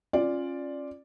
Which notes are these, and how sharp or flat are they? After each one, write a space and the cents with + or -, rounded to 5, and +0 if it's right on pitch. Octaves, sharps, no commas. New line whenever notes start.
C#4 -25 F4 +0 D5 +0